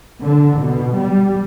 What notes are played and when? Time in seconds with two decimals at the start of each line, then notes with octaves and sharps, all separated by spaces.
0.22 D3
0.59 B2
0.95 G3